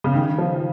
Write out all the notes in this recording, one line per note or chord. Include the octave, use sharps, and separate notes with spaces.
C#3
D#3
F3